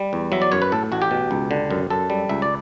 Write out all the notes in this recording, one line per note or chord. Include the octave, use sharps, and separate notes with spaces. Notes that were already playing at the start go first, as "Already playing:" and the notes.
Already playing: G3
E2
F#3 E5
D5
F#2 C#5
B4
A2 A4
A1 F#4
G4
B2
C#2
D3
F#2
F#2 A4
G3
C#2 E5
D5